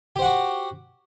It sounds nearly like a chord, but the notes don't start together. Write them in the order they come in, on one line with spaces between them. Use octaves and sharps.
G4 C5 F#5 F#4